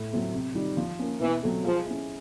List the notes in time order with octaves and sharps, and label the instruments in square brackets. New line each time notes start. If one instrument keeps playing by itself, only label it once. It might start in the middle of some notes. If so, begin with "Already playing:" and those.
Already playing: [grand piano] A2
F#3 A3 C4
C3
D#3 G3
F3
A#3 C#4
[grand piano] B2 [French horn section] E3
[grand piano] F#3 A3 C4
[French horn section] F3 [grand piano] G#3
[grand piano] C#4 E4